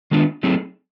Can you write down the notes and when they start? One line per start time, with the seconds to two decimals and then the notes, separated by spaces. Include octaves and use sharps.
0.11 D#3 G#3 B3 D4 F4
0.43 F#3 A3 C4 D#4 G#4